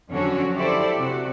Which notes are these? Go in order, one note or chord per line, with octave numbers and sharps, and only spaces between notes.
F2 D3 F#3 C#4 F#4
E4 G4 A4 C5 D5
C3 F#4